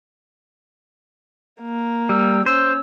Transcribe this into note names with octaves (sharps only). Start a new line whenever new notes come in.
A#3
G3 E6
C#4 C5 E6